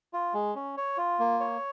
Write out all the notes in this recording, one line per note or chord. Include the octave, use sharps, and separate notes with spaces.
F4
G#3
C#4
C#5
F4
A#3
C#5